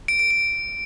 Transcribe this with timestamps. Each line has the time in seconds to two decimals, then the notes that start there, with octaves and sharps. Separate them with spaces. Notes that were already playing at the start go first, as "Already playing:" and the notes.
0.08 D7
0.19 D7
0.31 D7